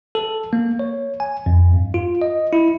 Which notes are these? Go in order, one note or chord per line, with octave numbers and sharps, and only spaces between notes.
A4
A#3
C#5
G#5
F2
G2
F4
D#5
E4